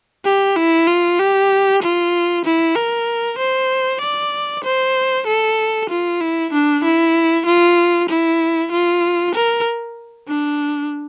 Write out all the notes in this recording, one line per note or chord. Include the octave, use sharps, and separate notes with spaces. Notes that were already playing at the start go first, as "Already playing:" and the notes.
G4
E4
F4
G4
F4
E4
A#4
C5
D5
C5
A4
F4
E4
D4
E4
F4
E4
F4
A#4
D4